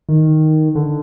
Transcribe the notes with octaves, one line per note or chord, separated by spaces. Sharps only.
D#3
D3